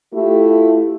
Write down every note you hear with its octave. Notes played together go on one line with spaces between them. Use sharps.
A3 E4 F4 G4